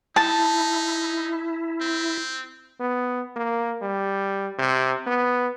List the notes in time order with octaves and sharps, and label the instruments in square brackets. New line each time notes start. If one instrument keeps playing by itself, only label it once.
[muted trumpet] D#4 [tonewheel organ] E4 [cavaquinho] A5
[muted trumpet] C4
[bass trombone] B3
A#3
G3
C3
B3